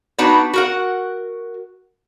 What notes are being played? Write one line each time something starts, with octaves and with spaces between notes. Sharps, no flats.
B3 D4 D#4 F#4
F#4 A#4 F#5